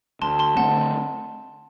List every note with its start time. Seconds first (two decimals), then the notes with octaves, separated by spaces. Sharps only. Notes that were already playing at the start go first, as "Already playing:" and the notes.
0.22 D2 A5 C6
0.39 A5 C6
0.57 D3 A3 C4 F#5 A5